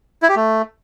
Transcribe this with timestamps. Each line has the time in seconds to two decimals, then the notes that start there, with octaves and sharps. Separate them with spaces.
0.23 E4
0.29 G4
0.36 A3